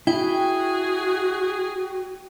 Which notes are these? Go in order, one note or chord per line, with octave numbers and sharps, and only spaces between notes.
E4 F#4 G#4 G5